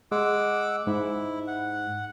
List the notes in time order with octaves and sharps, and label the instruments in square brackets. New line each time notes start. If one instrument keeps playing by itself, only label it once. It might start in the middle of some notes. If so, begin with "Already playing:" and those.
[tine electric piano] G#3 [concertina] F#5 D6 E6
[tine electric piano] G#2 [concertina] E4
[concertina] F#5